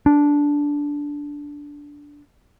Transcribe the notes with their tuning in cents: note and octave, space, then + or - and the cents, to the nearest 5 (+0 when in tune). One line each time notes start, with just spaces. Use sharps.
D4 -10